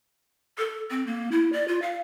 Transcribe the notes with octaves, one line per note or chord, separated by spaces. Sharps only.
A4
C4
A#3
E4
D5
F4
F5